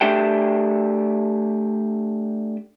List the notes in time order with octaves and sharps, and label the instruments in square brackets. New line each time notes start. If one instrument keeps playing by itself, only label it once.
[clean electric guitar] A3 D4 G4 E5 G5